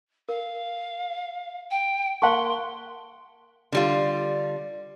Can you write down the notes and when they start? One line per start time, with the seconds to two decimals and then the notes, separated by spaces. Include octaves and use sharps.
0.29 A#4 F5
1.71 G5
2.22 A#3 F5 F#5 A5 C6 C#6
3.72 D3 G3 F4